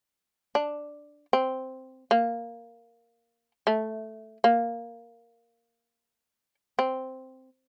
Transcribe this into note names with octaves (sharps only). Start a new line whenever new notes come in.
D4
C4
A#3
A3
A#3
C4